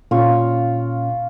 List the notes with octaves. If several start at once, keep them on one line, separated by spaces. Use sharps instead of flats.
A#2 C#4 F4 F5 C#6